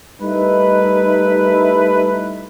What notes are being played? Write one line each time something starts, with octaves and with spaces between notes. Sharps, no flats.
G3 A3 D#4 E4 A#4 B4